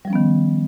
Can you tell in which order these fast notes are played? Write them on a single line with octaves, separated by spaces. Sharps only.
G3 F3 C#4 B3 D#3